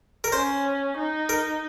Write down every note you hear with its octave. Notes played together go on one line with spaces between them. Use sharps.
A#4
C#4 C5
D#4
A#4